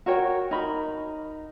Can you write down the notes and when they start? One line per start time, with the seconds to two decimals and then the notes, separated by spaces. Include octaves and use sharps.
0.06 F#4 A#4 C#5 G5
0.51 D#4 A#4 B5